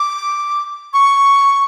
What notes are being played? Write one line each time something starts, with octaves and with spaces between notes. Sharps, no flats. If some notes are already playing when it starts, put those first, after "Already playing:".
Already playing: D6
C#6